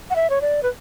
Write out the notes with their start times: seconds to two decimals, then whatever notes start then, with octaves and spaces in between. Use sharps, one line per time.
0.10 F#5
0.16 E5
0.30 C#5
0.41 D5
0.63 B4